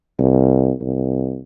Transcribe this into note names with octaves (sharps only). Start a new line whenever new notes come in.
C2
C2